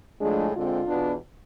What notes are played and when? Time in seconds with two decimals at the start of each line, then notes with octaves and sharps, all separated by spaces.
0.21 A2 F3 G#3 A3 D4 G#4
0.54 D3 G#3 C4 F4
0.88 E2 B2 B3 D4